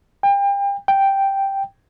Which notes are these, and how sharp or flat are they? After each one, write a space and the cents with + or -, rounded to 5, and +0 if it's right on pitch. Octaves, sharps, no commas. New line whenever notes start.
G5 +35
G5 +0